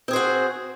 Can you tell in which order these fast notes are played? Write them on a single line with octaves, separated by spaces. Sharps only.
C4 G#4 C5 F#4